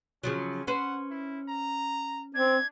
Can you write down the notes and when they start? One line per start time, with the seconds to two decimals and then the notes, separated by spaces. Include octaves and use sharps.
0.23 C#3 F3 F#3 C#4
0.67 C#4 B4 C5 F#5
1.11 E4
1.48 A#5
2.35 C4 D4 G#6